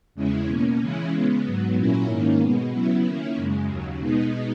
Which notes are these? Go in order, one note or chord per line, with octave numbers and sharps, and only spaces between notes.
E2 C#3 G#3 C#4 E4
B2 A#3 C#4
C#3 E3 G#3 C#4 E4
C#3 G#3 B3
G#2 F#3 B3
A#2 F#3 A#3 C#4 E4
G#2 D#3 A#3 C#4
B2 G#3 B3
C#3 F#3 B3 E4
D#3 A#3 C#4 E4
F#2 C#3 G#3
D#2 C#3 F#3
B2 G#3 B3 D#4